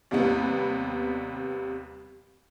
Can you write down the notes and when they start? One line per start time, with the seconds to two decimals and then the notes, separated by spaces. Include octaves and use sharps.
0.11 D#2 C3 G3 B3